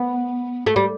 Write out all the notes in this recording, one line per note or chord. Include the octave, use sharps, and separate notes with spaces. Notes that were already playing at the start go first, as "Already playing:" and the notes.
Already playing: B3
A3
G3